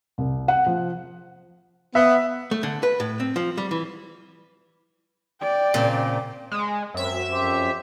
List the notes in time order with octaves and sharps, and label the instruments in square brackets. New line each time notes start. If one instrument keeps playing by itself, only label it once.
[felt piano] C2
F#5
F3
[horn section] B3 [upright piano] E5
[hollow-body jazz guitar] A3
D3
B4
A2
C4
F3
G3
E3
[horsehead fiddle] D5 [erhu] G5
[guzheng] A#2 [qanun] C#3 C4
[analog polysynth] G#3
[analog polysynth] F#2 E5 [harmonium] C4
[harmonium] F2 G4 C5